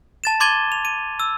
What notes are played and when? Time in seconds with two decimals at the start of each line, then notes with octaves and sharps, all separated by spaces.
0.24 A5 A6 E7
0.40 C6 D6 G#6 A6 D#7 G7
0.72 F7
0.85 D#7
1.20 E6